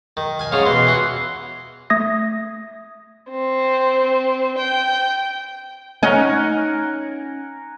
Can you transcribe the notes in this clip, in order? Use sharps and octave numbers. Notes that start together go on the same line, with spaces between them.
D#3
F5 G#5
G#2 C#4 C#5 F5 D#6
B2 E3 C6
E3 F#4
A3 E5 D#6 G#6 A#6
C4
G5
C#4 D#4 A#4 F#5 G#5